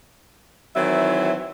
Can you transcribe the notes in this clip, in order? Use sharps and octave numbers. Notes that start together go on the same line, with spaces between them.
D#3 E3 F#3 C4 E4 E5